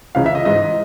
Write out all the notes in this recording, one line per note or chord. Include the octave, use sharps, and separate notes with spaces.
C#2 C#3 E3 F5
E5
D#5
G#2 E3 D#5